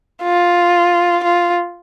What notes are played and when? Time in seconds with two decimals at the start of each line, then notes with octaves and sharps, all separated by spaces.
0.23 F4
1.24 F4